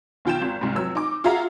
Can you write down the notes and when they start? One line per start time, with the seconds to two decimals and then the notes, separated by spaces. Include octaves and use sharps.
0.25 B1 D#3 F4 G5 G6 E7
0.42 G#1
0.61 C2 G#2
0.75 F1 F#3 E6
0.95 D#4 D6
1.24 F4 F#4 G#4 E5 F5 A#5